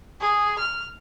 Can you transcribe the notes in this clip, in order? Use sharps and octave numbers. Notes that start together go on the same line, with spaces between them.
G#4
F6